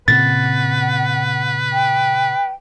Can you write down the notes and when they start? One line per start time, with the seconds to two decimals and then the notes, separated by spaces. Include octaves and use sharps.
0.08 A#2 C#3 C4 B4 F#5 A6
1.72 G5